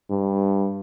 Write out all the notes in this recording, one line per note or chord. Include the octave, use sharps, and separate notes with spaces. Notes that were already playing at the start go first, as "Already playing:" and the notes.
G2